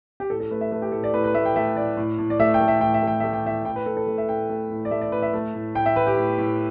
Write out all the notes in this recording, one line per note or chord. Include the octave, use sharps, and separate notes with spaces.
G4
A2 A4
A4
A3 B4
E5
A3 B4
G4
A2 A4
D5
A2 B4
B4
A3 E5
G5
A3 E5
A2 D5
A2
A2
D5
A3 E5
G5
A3
E5
A2 G5
E5
A3 G5
A3 E5
G5
A2 E5
A2 G5
B4
A2 A4
A4
A3
E5
A2 G5
A3
A2
D5
A3 E5
D5
A2 B4
E5
A3
A2
A2 G5
E5
A2 B4
G4
A2
A2